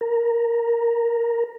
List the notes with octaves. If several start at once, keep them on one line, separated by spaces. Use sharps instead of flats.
A#4